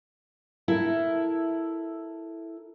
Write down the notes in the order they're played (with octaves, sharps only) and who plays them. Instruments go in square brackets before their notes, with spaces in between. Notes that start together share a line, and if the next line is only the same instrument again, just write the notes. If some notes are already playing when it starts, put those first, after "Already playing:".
[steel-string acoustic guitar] E4 A4 A#4